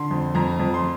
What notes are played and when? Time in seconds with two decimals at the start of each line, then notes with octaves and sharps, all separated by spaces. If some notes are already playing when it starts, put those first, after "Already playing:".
Already playing: D3 C6
0.11 F2
0.35 F2 A#5
0.59 F2
0.74 C6